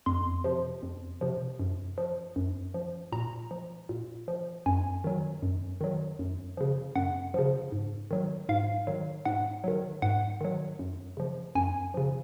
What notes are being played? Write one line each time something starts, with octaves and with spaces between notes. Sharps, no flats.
F2 C6
C3 F3
F2
C3 F3
F#2
F3
F#2
F3
A#2 A#5
F3
A#2
F3
F#2 G#5
D#3 F#3
F#2
D#3 F#3
F#2
C#3 F3
F#2 F#5
C#3 F3
G#2
D#3 F#3
G#2 F5
D#3 F#3
G#2 F#5
D#3 F#3
G#2 F#5
D#3 F#3
F#2
C#3 F3
F#2 G#5
C#3 F3